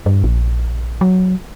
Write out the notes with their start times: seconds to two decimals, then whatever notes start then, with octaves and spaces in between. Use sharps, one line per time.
0.06 G2
0.24 A#1
1.01 F#3